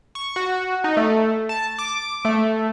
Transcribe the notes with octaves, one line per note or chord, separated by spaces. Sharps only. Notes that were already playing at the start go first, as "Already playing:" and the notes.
C#6
F#4
D#4
A3
A5
D6
A3